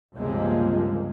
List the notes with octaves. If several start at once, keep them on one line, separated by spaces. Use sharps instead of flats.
C#2 G2 C3 F3 G#3 A#3